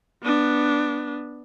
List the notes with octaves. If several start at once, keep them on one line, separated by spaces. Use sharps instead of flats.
B3 D4